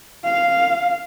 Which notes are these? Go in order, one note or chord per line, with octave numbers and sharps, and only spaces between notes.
F5